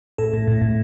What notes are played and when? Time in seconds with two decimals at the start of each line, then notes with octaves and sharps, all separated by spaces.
0.18 A2 A4
0.33 A2
0.48 A2
0.62 A2